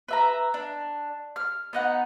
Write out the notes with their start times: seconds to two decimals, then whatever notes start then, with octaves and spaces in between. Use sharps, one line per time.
0.08 B4 E5 A#5
0.54 D4
1.36 F6
1.73 B3 D#4 F#5